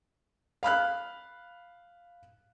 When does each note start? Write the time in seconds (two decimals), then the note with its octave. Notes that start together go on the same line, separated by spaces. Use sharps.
0.63 F5 B5 F6 F#6